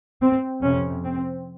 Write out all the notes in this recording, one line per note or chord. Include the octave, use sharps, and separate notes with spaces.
C4
F2 C3 C#4
C4